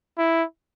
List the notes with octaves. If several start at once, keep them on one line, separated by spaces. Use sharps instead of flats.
E4